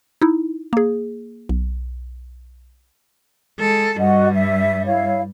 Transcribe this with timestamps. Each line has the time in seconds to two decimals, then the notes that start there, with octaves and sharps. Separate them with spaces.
0.22 D#4 E4
0.73 A#3 G#4
1.49 B1
3.60 G#3 A4
3.99 G2 G3 F#4 D#5 F#5
4.34 E5
4.86 E4 C#5 F5